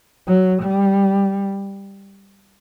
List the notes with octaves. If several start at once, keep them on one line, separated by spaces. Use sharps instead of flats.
F#3
G3